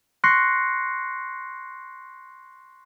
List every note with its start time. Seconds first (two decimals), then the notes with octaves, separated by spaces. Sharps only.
0.24 C6 C#6 F#6 A#6 C7 C#7